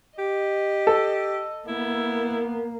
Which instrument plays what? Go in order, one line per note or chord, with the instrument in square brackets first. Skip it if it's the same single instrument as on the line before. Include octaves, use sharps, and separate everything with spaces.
[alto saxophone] G4 [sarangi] D#5
[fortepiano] A4
[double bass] A#3 [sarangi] B3 [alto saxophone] E4